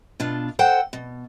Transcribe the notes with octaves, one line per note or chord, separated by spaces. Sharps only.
B2 D4 F4
A4 C5 F#5 G5
B2